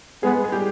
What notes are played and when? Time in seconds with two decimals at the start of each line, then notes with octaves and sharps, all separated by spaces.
0.23 G#3 B3 G#4
0.44 G#4
0.52 G3 G4